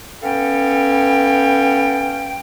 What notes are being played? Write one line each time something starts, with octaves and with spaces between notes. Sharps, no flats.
B3 C#4 A4 F5 G5